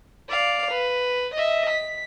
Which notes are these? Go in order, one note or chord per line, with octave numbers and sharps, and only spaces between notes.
D5 F5
B4
D#5 E5
B6